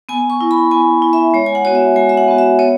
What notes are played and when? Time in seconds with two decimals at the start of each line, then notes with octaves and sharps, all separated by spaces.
0.09 B3 G#5
0.30 C#6
0.41 E4
0.51 B5
0.71 B3 G#5
1.02 E4
1.13 E5
1.34 G#3 C#5
1.46 G#5
1.55 F#5
1.65 B3 F#4 C#5
1.75 E5
1.96 G#3 G#5
2.09 E5
2.17 F#5
2.28 B3 F#4
2.38 E5
2.59 B3 C#5